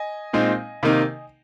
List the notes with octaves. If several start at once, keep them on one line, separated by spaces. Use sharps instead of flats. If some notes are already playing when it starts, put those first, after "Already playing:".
Already playing: D#5 G#5
A#2 G#3 C4 D#4
C3 D#3 A#3 D#4